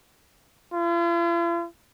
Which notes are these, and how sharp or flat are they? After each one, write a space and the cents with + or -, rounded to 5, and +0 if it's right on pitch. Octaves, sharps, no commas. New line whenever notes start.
F4 -45